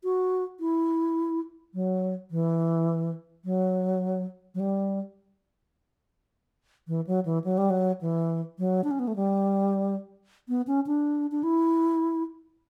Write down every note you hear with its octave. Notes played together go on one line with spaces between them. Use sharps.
F#4
E4
F#3
E3
F#3
F#3
G3
E3
F#3
E3
F#3
G3
F#3
E3
F#3
D4
C#4
B3
A3
G3
B3
C#4
D4
D4
E4